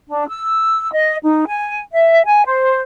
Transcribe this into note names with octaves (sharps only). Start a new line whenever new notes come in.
D4
E6
D#5
D#4
G#5
E5
G#5
C5